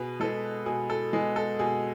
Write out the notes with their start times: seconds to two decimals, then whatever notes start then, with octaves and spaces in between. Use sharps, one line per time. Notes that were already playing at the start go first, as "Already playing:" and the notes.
Already playing: B2 G#4 B4
0.20 G#3 B3 A4
0.66 B2 G#4
0.90 A4
1.13 G#3 B3 G#4
1.36 A4
1.59 B2 G#4